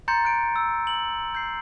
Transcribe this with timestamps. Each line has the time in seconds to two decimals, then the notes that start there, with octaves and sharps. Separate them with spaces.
0.08 A#5 C6 G6 A6 C#7
0.25 F#6 D7
0.56 E6
0.87 F#7
1.35 G6 C7